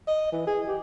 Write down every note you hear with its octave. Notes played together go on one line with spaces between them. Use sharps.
D#5
E3
G#4
G4